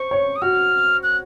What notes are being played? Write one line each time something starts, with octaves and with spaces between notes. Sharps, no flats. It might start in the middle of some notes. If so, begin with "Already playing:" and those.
Already playing: C5 C#6
C#5
D#6
F#4 F6
F#6